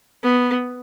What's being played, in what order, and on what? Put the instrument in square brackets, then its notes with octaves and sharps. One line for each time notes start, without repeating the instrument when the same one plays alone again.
[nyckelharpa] B3